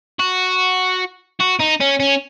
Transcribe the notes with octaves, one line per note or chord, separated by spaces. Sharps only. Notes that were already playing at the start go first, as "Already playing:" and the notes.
F#4
F#4
D#4
C#4
C#4